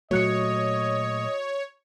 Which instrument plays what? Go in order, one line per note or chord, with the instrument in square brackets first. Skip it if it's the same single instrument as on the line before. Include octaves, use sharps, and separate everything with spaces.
[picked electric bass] A#2 F#3 A3 [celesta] F#4 F#6 C#7 [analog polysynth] C#5 [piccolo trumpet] D#5